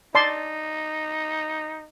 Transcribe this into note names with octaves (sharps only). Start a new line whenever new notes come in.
D#4 D5 A5 C6